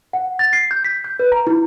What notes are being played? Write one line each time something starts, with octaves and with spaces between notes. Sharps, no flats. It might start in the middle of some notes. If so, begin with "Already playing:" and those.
F#5
A6
C7
G6
B6
G6
B4
A#5
E4